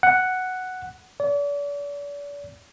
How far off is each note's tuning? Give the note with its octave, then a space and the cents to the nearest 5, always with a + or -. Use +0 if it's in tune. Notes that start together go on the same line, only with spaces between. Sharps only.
F#5 +0
D5 -40